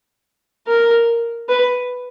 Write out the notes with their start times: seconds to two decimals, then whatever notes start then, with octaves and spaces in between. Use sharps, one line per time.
0.68 A#4
1.49 B4